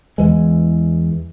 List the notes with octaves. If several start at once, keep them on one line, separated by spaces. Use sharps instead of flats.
E2 E3 G#3